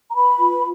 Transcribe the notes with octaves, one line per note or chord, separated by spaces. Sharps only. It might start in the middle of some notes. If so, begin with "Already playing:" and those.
A#5
B4 B5
F4